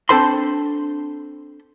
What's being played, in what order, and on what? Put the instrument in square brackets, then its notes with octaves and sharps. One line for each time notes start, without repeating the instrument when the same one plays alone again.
[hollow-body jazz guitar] C4 D4 A4 C5 B5 C6